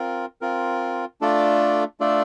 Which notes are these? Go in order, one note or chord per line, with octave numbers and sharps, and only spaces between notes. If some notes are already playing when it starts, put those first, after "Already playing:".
Already playing: C4 F4 A#4
C4 F4 A#4
A3 D4 F4 A4 D5
A3 D4 F4 A4 D5